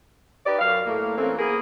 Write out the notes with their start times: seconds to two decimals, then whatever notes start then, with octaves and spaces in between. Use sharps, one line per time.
0.46 D#4 G4 B4 D5
0.59 F#2 F5
0.86 A2 A#3
1.17 E3 A3 A#3 C4 C#4
1.39 A#3 B3 G#4